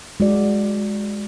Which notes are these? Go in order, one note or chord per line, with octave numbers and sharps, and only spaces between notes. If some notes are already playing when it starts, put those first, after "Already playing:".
G#3 F#4 D5